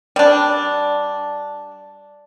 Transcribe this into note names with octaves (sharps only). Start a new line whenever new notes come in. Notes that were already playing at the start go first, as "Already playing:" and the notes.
G3 D4